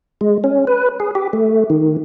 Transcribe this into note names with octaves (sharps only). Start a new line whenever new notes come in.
G#3
C#4
B4
G#4
G4
A3
D#3